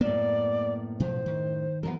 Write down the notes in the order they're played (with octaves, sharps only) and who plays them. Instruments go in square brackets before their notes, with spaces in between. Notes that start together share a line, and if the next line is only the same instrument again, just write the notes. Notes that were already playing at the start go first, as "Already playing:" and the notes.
[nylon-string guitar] F#2 A2 [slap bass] A#3 B3 [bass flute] D5
[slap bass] B2 F3 [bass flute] C5
[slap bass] D#3
[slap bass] E3 F#3 [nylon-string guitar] B3 D4 A#4